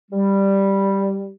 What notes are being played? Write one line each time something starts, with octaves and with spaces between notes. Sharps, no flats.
G3